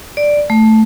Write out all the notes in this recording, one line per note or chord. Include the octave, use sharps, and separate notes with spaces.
D5
A3